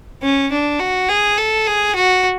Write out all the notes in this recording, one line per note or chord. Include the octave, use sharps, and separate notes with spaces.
C#4
D4
F#4
G#4
A4
G#4
F#4